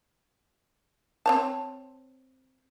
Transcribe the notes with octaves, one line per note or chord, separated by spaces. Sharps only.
C4 C#5 A5